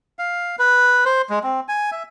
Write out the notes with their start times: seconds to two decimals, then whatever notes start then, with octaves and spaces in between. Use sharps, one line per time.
0.19 F5
0.59 B4
1.05 C5
1.30 G#3
1.44 C4
1.68 G#5
1.92 E5